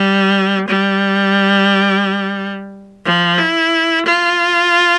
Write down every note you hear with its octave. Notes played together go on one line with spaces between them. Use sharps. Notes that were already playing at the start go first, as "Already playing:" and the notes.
Already playing: G3
G3
F3
E4
F4